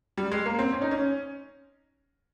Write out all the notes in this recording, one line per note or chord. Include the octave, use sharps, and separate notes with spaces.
G3
G#3
A#3
C4
C#4
D#4
C#4